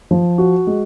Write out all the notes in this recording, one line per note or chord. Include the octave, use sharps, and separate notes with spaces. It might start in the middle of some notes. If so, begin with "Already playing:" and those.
F3
F#4
G#3